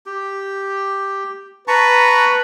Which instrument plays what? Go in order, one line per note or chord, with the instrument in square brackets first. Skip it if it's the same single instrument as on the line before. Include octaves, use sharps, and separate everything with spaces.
[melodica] G4
[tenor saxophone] B4 [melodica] A5 A#5 C#6